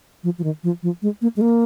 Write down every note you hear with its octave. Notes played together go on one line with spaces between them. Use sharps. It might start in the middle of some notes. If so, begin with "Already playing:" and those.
F3
F3
D#3
F3
F3
G#3
A#3
G#3
A#3